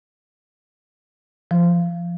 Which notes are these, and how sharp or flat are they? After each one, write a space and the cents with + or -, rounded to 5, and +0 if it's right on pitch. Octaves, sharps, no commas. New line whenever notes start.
F3 -15